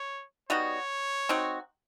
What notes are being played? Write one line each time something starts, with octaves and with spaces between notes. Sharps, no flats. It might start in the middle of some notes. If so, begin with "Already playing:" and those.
Already playing: C#5
G3 B3 D#4 F#4 C#5
C4 D#4 F#4